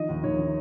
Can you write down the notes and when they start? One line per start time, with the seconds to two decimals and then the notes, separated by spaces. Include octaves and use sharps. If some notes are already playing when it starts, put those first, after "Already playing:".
Already playing: D#3 F3 D#5
0.09 D#2
0.24 D#2 C#5
0.39 D#3